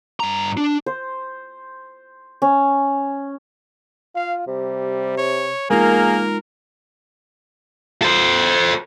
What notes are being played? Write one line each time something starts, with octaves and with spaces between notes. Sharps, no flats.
G2 A#5
D4
C5
C#4
F4 F5
C3 G3
C#5
G#3 A#3 D#4 F4 G#4 A#4
A4 C5